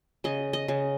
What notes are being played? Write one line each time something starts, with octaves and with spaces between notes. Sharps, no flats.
C#3 D#5
D#5
C#3